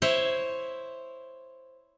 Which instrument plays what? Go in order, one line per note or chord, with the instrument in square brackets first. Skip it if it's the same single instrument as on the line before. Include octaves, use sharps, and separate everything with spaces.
[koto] E4 C5 C#5 E5